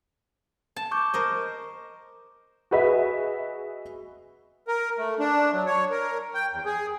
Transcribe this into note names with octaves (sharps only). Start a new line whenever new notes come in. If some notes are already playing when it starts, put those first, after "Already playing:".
A5
C#6 D6 G6
A#4 C5 D#5
F#4 G#4 B4 D#5 E5
A#4
A3
D4
F#3
C#5
A#4
G5
E2
G#4